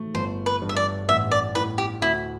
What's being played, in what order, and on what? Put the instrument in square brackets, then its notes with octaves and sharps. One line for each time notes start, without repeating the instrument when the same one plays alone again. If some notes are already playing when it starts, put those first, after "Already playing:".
Already playing: [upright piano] A3
[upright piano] G1 [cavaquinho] C5
[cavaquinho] B4
[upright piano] G2
[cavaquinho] E5
D5
[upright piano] A1 [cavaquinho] E5
[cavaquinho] D5
[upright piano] A2 [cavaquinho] B4
[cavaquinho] G4
[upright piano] D2 [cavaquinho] E4